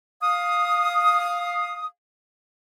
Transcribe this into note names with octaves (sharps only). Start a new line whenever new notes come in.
F5 D#6